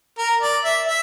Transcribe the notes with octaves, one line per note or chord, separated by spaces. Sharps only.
A#4
D5
E5
E5